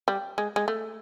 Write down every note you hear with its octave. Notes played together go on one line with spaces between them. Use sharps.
G3
G#3
G#3
A3